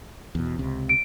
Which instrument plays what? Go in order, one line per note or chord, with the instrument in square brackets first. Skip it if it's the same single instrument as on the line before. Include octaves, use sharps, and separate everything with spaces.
[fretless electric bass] E2 B2
C#2 C3
[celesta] D7